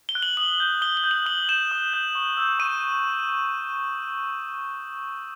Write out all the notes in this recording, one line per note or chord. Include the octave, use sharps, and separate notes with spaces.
G7
F#6
F#7
D#6 F#7
G6
D#6 G7
G7
G6
F#7
D#6 F#7
G6 E7
D#6
G6
C#6
E6 G6
C#6 D#7